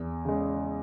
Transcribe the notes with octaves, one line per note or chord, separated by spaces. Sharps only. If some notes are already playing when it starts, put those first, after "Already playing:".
Already playing: E2
C#3 G#3